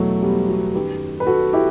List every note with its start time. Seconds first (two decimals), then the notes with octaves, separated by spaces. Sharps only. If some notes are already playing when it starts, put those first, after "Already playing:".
Already playing: E2 B2 F#3 A3
0.22 G3 B3
0.48 F#4 A4
0.74 F#2 D#3 G4 B4
1.20 B4
1.27 F#4 A4
1.53 E4 G4